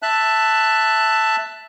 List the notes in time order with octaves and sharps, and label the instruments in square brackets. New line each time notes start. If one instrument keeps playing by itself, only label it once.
[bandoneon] E5 A5 F#6